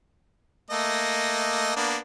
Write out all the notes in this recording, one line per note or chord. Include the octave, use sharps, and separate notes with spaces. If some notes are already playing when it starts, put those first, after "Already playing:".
A3 A#3 D#5
A#3 B3 D4